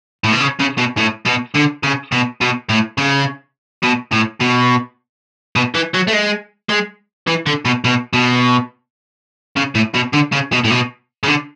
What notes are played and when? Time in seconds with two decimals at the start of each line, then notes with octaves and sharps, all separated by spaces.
0.24 A2
0.33 B2
0.40 C#3
0.60 C#3
0.78 B2
0.98 A2
1.26 B2
1.55 D3
1.83 C#3
2.12 B2
2.41 B2
2.69 A2
2.98 C#3
3.83 B2
4.13 A2
4.41 B2
5.56 B2
5.74 E3
5.94 F#3
6.07 A3
6.13 G#3
6.69 G#3
7.27 E3
7.46 D3
7.65 B2
7.84 B2
8.13 B2
9.56 C#3
9.75 A2
9.95 B2
10.14 D3
10.32 C#3
10.52 B2
10.64 A2
10.70 B2
11.23 C#3
11.28 D3